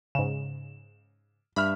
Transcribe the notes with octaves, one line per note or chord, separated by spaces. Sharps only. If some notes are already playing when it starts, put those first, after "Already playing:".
G#2 C#3 E7
G2 E5 B5 F6